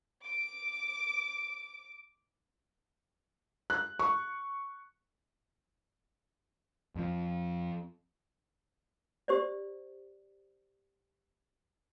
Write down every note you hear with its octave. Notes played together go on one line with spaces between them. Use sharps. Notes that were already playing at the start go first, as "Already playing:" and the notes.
D6 D7
F#6
C#6
F2 F3
G4 C5 D5